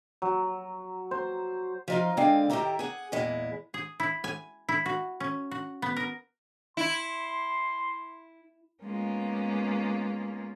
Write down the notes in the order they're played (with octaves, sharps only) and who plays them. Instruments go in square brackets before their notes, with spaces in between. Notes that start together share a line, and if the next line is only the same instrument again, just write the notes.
[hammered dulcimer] F#3
C5
[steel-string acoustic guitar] F3 D#4 F4
D3 G#3 C4 F5
A2 D#3 G4 E5 A#5
G#4 F#5
E2 A#2 G#3 E4
[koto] G#4
E4
G#5
E4
F#4
C#4
F#4
B3
A#4
[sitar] E4 [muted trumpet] C6
[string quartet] G#3 A#3 B3 C#4 F4